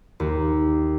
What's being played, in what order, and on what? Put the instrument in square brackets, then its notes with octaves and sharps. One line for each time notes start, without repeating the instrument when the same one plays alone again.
[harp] D#2